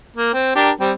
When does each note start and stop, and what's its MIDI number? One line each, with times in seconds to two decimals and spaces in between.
0.17 0.32 58
0.34 0.53 60
0.56 0.70 62
0.56 0.70 67
0.56 0.70 70
0.80 0.92 55
0.80 0.92 60